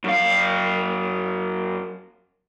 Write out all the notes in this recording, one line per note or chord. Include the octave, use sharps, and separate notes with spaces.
F#2 F5